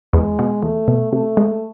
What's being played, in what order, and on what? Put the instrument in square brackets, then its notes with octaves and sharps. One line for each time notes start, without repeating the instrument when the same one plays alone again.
[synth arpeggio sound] E2 [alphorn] G#3
[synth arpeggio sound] B2
[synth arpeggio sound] E2 [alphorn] A3
[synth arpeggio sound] B2
[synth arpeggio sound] C3 [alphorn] A3
[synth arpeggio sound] G#3